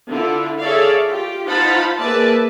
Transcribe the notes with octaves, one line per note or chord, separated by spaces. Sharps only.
D3 E4 F4
G#4 A4 C#5 D5 E5 F5
F4 G4
D#4 F4 C5 F#5 A5 B5
A#3 G#4 B4 D5 E5 A5